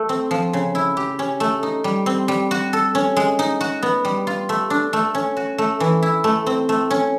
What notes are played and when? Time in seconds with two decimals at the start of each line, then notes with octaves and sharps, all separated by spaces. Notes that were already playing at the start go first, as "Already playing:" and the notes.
Already playing: A3
0.09 C4
0.31 F3
0.53 C#3
0.75 E4
0.97 G4
1.19 C#4
1.40 A3
1.63 D#4
1.84 G3
2.06 C4
2.28 G3
2.51 F#4
2.73 A4
2.95 C#4
3.17 G#3
3.39 D#4
3.61 F#4
3.83 B3
4.05 G3
4.27 F4
4.49 A3
4.70 D4
4.93 A3
5.15 C#4
5.37 F#4
5.58 A3
5.80 E3
6.03 E4
6.24 A3
6.46 C4
6.69 A3
6.90 C#4